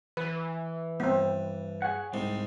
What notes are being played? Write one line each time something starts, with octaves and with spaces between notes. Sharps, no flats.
E3 B4
G2 B3 C4
G#4 C#5 F#5
C2 G#2 C3 C4